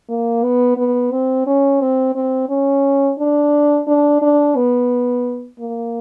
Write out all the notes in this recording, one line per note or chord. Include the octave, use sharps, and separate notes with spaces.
A#3
B3
B3
C4
C#4
C4
C4
C#4
D4
D4
D4
B3
A#3